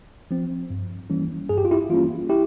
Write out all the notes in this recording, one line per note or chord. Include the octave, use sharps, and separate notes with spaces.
F3 C4
G2
E3 G3 A#3 C#4
G2 G#4
G4
F4
E4 G4
E3 G3 A#3 C#4 F4
E4 G4